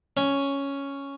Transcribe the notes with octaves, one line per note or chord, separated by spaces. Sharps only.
C#4